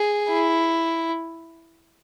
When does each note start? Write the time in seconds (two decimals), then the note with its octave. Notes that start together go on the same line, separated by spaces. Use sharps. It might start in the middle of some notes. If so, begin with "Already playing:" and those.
Already playing: G#4
0.30 E4